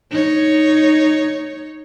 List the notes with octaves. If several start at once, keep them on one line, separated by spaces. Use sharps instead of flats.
D#4 C#5